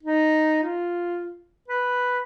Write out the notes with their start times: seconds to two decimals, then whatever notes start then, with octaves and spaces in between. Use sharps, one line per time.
0.03 D#4
0.63 F4
1.68 B4